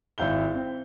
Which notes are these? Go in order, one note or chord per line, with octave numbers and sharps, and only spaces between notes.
G#1 E4 F5 G6 G7
C4